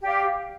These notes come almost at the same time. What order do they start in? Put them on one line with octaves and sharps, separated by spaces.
G4 D5 F5